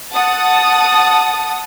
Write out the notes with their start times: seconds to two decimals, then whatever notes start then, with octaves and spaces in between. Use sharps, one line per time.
0.13 F#5 A5 D#6 A6